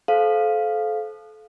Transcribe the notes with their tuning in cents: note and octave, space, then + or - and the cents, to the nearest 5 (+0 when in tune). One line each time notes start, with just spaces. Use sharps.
A4 -30 C5 +0 F5 +0